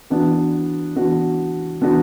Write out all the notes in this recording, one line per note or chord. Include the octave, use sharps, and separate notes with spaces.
E3 B3 D4 F#4
E3 B3 D4 F#4
E3 B3 D4 F#4